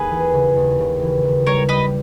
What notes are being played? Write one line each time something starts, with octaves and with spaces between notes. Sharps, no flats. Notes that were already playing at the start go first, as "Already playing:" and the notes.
Already playing: D#2 G#4 B4
E3
C#3
D#2
C#3
E3
D#2
G3 A#4 C#5
G3 B4 D#5